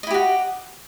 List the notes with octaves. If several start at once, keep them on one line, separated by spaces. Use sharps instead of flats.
E4 F#4 G4 D#5